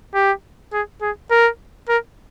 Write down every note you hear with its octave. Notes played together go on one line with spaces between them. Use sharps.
G4
G#4
G#4
A#4
A#4